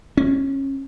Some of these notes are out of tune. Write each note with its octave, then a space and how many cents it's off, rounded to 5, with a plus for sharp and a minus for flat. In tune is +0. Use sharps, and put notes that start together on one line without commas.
C#4 -25